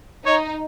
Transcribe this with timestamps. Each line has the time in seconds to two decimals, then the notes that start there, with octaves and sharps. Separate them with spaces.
0.25 D#4 C#5